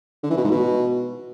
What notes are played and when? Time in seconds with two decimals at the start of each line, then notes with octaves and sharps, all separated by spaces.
0.23 D3
0.30 E3
0.37 B2
0.44 G#2
0.51 B2